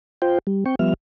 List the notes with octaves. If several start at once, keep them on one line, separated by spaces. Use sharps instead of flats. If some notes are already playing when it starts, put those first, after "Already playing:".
F4 C5 G5
G3
C4 G5 C#6
F3 G3 B3 E5 F6